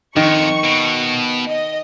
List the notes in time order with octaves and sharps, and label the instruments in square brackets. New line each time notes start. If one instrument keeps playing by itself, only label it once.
[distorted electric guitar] F2 [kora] D#3 [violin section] C#6
[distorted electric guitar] B2
[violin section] D#5